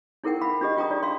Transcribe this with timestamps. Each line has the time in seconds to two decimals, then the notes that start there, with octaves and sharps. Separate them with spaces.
0.24 D#4 E4 G#4 A#4 F#5 G5
0.41 F5 B5
0.61 D4 F4 G4 G#4 D#5
0.77 F4 G5 A#5 D#6
0.91 D4 F4 D5
1.03 F5 C6